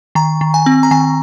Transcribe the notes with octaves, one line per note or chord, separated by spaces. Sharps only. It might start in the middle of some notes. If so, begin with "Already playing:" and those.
D#3 A#5
D#3
G#5
C4
A#5
D#3 G#5